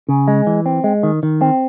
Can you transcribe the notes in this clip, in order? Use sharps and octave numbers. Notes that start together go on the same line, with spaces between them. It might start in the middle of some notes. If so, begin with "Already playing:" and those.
C#3
G#3
E3
C4
G#3
D#3
D#3
C4